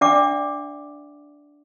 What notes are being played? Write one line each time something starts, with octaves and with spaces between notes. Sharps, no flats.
D4 D5 E5 F#5 D6